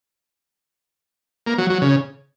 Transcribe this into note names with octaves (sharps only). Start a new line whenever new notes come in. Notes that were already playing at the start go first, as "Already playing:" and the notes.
A#3
F#3
F#3
C#3